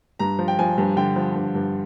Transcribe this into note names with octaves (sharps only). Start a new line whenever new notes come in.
G2 A#5
F3
G5
F3 G#5
G2
D3 G5
F3
G2
G2